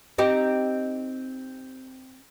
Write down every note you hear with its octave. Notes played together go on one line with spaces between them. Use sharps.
C4 D#4 G4